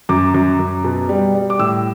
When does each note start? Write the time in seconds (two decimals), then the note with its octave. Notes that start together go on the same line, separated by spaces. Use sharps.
0.09 F#2 D6
0.34 F#2
0.59 F#2
0.84 B2
1.09 G3
1.35 G3
1.50 D6
1.59 A2 E6